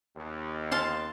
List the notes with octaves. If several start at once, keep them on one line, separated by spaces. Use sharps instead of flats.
D#2
F5 A5 C6